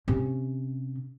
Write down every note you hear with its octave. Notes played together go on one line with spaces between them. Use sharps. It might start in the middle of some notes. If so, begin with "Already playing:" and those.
C3 C#4